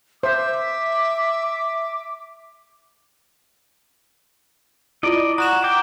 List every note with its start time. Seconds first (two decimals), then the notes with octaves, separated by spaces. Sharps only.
0.23 C5 E5 D6
5.03 E4 F4 D5 D#5
5.38 F#4 A#5 F#6 E7
5.64 G5 D6